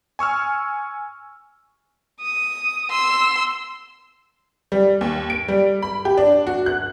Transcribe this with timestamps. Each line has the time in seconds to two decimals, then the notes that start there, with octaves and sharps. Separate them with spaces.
0.19 G#5 C#6 E6 F6
2.20 D#6
2.91 C6 E6
4.72 G3
5.01 D#2
5.30 D7
5.48 G3
5.83 B5
6.05 G4
6.18 D4
6.47 F#4
6.66 F#6